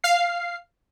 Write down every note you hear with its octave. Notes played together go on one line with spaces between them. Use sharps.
F5 C7